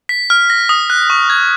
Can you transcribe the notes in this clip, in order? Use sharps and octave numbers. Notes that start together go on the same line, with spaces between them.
B6
F6
A#6
D#6
F#6
C#6
G#6